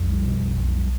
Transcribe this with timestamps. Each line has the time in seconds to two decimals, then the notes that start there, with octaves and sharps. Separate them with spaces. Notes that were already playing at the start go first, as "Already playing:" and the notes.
Already playing: B1 F2
0.10 G3
0.26 B2
0.42 B1
0.58 B1
0.75 G3